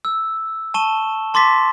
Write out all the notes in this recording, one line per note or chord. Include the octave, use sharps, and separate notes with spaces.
E6
A5 C#6 D#7 E7 G7
A5 C6 D6 A6 B6